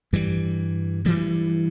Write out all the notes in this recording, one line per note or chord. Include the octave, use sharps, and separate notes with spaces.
G2 E3 G3
G2 E3 G3